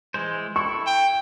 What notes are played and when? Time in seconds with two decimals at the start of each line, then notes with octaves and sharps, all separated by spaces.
0.14 E3 G#3 C5
0.56 E4 A4 C#6
0.87 G5